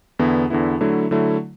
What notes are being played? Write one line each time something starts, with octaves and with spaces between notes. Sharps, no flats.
E2 D3 B3 E4
E2 D3 B3 E4
D3 F#3 A3 E4
D3 F#3 A3 E4